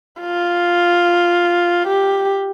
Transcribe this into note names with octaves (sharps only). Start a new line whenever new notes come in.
F4
G4